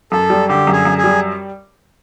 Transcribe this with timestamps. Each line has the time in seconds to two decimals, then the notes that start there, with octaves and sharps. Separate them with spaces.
0.12 F#2 A4
0.30 G3
0.48 D3 G4
0.67 F#2
0.73 G#4
0.85 F#2
0.98 G#4
1.04 G3